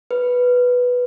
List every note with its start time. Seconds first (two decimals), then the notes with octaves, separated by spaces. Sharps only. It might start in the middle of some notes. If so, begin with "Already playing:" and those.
0.11 B4